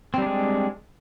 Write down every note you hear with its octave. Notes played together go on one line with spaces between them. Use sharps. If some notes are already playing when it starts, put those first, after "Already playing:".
G3 G#3 C4 D4